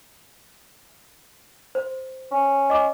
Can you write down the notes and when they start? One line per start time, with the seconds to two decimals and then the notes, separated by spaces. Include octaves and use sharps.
1.75 C5
2.32 C#4
2.70 D#5 D6